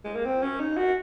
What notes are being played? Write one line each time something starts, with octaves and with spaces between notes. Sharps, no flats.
G#3
A#3
C4
C#4
D#4
F#4